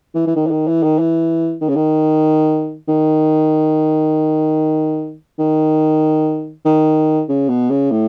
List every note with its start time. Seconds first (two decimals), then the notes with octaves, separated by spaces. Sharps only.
0.15 E3
0.27 E3
0.36 D#3
0.47 E3
0.51 D#3
0.67 E3
0.83 D#3
0.99 E3
1.61 D#3
1.69 C#3
1.76 D#3
2.88 D#3
5.39 D#3
6.65 D#3
7.29 C#3
7.49 B2
7.70 C#3
7.91 A2